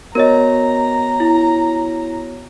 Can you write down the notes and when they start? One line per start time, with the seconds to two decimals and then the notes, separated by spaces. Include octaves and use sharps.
0.15 B3 F#4 A#4 C#5 D#5 A#5
1.20 E4